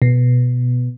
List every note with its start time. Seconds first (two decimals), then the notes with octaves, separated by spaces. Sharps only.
0.02 B2